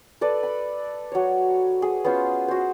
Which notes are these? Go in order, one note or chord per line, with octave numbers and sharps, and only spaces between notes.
A4 B4 D5
B5
F#3 C#5
G#4
B3 C#4 F4 C5
F#4 C5